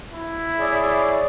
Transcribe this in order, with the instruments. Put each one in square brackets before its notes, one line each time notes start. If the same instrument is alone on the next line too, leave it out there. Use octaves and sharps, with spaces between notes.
[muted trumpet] E4
[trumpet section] G#4 C#5 D5